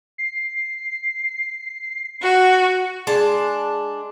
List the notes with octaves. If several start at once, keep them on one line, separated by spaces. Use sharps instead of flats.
C7
F#4
G#3 D4 A5